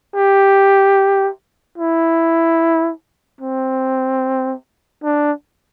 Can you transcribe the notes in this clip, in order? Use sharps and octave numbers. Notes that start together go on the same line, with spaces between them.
G4
E4
C4
D4